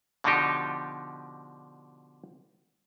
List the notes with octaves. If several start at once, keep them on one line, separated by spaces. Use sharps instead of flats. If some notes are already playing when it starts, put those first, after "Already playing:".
B2 D3 F3 D4 D#4 G4